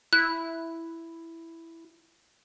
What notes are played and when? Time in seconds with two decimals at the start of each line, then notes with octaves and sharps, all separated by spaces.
0.13 E4 F#6